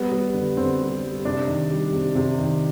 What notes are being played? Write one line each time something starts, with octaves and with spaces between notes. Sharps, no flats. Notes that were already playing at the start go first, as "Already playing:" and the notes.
Already playing: G3 B3
G3
D3
D3 C4
G3
G3
C3 D4
D#3
G3
C3
C3
D#3